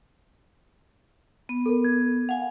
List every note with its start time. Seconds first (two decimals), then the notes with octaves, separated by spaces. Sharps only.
1.49 B3
1.66 A4 A#4
1.84 G#6
2.29 F5 F#5 G#5